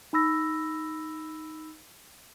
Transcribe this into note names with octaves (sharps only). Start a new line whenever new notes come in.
D#4 B5 E6 A#6